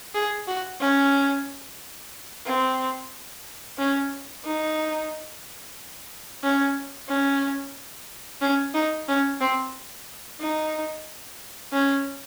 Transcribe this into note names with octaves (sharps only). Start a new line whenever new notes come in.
G#4
F#4
C#4
C4
C#4
D#4
C#4
C#4
C#4
D#4
C#4
C4
D#4
C#4